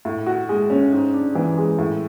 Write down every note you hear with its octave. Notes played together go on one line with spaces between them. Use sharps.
A2
F#4
G#3
C#4
G#2
D4
E3
G#3
A2